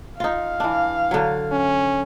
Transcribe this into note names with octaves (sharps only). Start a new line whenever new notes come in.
D#4 F4 F5
E3 D4
D3 F#3
C#4